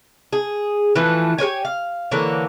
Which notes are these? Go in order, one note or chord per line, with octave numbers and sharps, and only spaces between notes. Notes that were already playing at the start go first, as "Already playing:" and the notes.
G#4
E3 F3 A3 B4
G4 A#4 C#5 G#5
F5
D3 E3 A#3 C#5